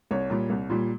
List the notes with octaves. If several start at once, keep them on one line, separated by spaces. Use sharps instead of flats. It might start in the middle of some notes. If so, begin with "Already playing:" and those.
C2 C#5
A#2 G3
C2
A#2 G3